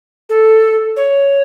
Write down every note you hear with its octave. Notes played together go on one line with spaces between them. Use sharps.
A4
C#5